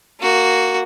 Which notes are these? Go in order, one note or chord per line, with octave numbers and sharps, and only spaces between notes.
A#3 F#4